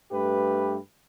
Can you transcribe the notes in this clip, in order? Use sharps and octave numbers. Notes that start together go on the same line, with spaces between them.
G2 A3 G4 B4